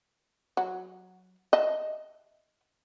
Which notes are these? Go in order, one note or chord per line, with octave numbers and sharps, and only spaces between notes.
F#3
D#5 E5 A5